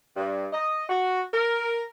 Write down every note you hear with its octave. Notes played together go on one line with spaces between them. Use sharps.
G2
D#5
F#4
A#4